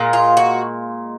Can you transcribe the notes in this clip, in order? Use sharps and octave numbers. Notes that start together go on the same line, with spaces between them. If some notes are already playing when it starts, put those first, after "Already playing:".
Already playing: A#2 G#3
F4
F#4